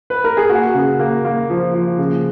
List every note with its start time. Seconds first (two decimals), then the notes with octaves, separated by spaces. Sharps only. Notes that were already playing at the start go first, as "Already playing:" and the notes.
0.10 B4
0.24 A#4
0.37 G#4
0.49 A#3 F#4
0.74 C#3
0.99 A#3
1.25 A#3
1.50 F3
1.74 F3
1.98 C#3